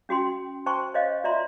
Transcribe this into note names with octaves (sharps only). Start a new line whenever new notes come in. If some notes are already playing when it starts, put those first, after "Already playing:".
C#4 F#4 G5 C6
C5 G5 A5 C6 C#6
C5 C#5 D#5 F5
F4 D5 E5 A#5 C6